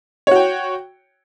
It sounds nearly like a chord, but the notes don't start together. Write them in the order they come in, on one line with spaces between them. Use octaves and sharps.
C#5 F#4 G5